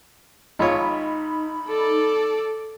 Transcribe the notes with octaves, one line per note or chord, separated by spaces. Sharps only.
G#1 D#4 F4 C#5 B5
A4 D5